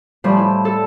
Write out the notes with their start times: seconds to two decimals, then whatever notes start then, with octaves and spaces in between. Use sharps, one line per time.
0.24 A2 F3 G3
0.37 E4
0.65 A4